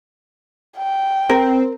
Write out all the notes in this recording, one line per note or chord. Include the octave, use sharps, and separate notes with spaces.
G5
C4 A#4